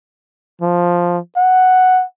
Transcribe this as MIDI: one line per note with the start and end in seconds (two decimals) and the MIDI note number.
0.62 1.19 53
1.37 2.04 78